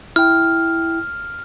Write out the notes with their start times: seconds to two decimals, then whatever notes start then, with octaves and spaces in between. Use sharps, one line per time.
0.16 E4 G5 F6